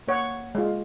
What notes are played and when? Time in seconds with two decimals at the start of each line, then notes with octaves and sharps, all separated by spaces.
0.08 A#3 C#5 F#5
0.55 G#3 F4